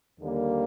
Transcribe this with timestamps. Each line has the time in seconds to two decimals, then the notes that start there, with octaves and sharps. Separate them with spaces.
0.20 D#2 D3 G3 A#3